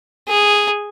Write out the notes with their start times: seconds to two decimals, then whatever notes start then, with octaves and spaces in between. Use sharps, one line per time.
0.28 G#4